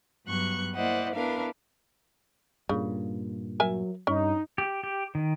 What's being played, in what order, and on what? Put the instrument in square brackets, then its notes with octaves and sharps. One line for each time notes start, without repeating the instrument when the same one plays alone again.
[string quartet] G2 F#3 B3 C#6 F#6
A#3 E4 C5 D5 D#5 F#5
B3 D4 E4 A#4 B4 F5
[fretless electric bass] G2 A#2 [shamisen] C#3
[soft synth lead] F#3 [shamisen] A#4 E5 G#5
[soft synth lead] G2 [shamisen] C#4 [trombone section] D#4
[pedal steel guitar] G4
G4
D#3